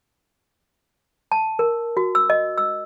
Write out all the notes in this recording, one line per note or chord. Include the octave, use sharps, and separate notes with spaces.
A5
A#4
F#4
E6
D#5
E6